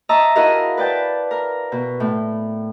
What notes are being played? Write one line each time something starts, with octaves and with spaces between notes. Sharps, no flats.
D#5 E5 A5 A#5 C#6 E6
E4 F#4 G#4 A#4 D#5 F5
B4 D5 G5 A5
A#4
B2
A2